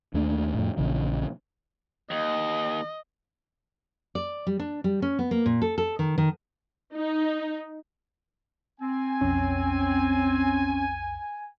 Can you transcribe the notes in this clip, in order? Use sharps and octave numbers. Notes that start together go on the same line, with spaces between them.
D#2 A3 D4
F2 A2
A#1 C#3 E3
D#2 D#5
D5
G3
D4
G3
C#4
B3
A#3
A#2
A4
A4
D#3
D#3
D#4
C4 G#5
B1 F2 C#4